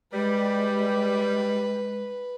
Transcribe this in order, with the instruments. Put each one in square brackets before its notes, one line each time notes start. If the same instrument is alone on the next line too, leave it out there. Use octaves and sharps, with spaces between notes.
[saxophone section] G3 [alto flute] G#3 [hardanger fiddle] B4